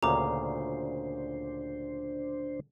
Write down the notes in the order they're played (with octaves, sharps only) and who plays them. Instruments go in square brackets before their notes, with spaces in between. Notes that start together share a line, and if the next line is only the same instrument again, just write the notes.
[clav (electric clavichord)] D2 A#2 C#3 [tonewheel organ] D4 C5 [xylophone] A#5 D6